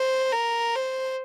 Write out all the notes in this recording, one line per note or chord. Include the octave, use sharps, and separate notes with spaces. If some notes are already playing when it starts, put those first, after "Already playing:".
Already playing: C5
A#4
C5